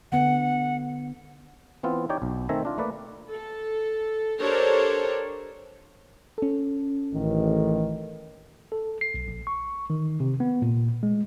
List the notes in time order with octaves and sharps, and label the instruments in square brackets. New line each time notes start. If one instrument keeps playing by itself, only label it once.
[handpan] D3 B3 [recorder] F#5
[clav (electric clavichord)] E3 B3 C4 F4
D#4 G4 C#5 D5 G5
B1
D#3 A3 C4 E5 G#5 A#5
D4 F4
A3 A#3 B4 D5
[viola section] A4
D4 G4 A4 A#4 C5 C#5
[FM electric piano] C#4 A4
[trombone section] A1 D#3
[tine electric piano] A4
C7
B1
A#1
C#6
D#3
C3
B3
A#2
G#3